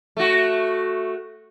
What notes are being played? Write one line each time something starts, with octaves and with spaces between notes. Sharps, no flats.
A3 F#4